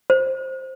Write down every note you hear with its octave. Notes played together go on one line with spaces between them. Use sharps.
C5